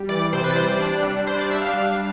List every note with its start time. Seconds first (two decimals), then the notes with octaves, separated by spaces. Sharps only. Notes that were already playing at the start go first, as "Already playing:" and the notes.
Already playing: G3
0.09 E3 D5
0.33 C3 C5
0.44 B4
0.51 D5
0.56 G3 C5
0.68 D5
0.80 D4
1.03 G3
1.27 D4 C5
1.39 D5
1.50 D4 E5
1.62 F5
1.74 G3